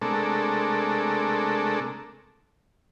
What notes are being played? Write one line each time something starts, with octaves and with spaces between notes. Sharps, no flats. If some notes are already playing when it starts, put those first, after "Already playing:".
C3 G#3 A3 D4 A4 A#4